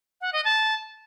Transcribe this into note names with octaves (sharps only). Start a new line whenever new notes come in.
F#5
D#5
A5